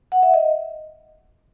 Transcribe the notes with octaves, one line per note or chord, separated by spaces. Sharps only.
F#5
E5
D#5